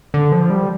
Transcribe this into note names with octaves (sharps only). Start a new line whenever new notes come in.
D3
F3
G3